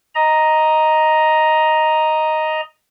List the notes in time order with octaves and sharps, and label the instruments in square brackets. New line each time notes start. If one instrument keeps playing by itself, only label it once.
[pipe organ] D#5 A#5